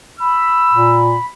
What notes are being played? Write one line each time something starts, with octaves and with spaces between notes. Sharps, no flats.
B5 E6
A#2